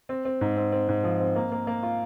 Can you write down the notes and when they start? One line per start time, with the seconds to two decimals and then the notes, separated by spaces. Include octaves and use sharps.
0.09 C4
0.25 C4
0.41 G#2
0.57 C4
0.72 C4
0.89 G#2
1.04 F3
1.20 C4
1.36 A#3
1.52 A#3
1.67 A#3
1.83 F4